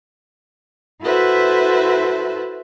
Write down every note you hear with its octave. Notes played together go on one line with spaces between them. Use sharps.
E4 F#4 A4 B4 C5 E5